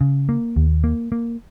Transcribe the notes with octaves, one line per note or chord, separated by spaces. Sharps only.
C#3
A#3
D#2
A#3
A#3